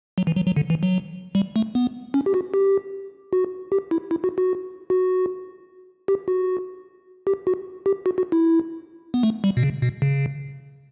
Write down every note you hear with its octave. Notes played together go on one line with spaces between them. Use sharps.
F#3
E3
F#3
F#3
D3
E3
F#3
G3
A3
B3
C#4
G4
F#4
G4
F#4
G4
E4
E4
F#4
F#4
F#4
G4
F#4
G4
F#4
G4
F#4
F#4
E4
B3
A3
G3
B2
C#3
B2
C#3